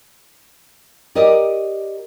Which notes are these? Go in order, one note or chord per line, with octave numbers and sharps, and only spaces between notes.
G4 A#4 D5 D#5